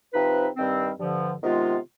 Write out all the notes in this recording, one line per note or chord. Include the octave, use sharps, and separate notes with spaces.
C3 F3 C4 D#4 B4
G2 D#3 G3 C4
G2 D3 F3
C3 D#3 G#3 B3 F4